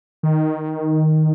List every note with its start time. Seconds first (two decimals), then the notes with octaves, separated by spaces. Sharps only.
0.23 D#3